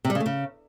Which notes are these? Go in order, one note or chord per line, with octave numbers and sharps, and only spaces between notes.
C3
G3
C#3
A3
C#3